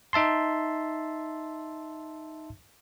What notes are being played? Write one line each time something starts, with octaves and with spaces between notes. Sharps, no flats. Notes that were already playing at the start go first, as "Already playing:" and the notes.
D#4 E5 A5 C6